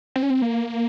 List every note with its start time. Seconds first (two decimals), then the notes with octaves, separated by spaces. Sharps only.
0.16 C4
0.23 C#4
0.30 C4
0.42 A#3